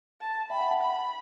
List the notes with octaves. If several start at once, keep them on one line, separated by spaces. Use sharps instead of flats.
A5
E5 G5 B5
F#5 A5
F#5 A5
B5